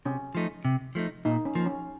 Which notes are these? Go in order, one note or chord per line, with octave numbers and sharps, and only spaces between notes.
C3 C#4
F3 A3 D#4
C3
F3 A3 D#4
A#2 D#4
C#4
F3 A#3
C#4